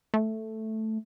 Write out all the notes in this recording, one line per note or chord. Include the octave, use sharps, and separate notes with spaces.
A3